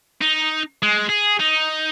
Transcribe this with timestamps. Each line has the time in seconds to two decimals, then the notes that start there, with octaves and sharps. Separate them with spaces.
0.21 D#4
0.82 G#3
1.09 G#4
1.39 D#4